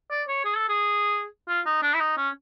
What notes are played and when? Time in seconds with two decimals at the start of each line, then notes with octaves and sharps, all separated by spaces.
0.10 D5
0.28 C#5
0.45 G#4
0.57 A4
0.69 G#4
1.48 F4
1.66 D#4
1.82 D4
1.94 E4
2.00 D#4
2.17 C#4